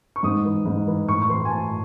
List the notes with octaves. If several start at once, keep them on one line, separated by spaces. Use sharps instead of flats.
C#6
G#2 D#6
E3
G#2
E3
A2 C#6
C#6
E3 C6
G#5
A2 A5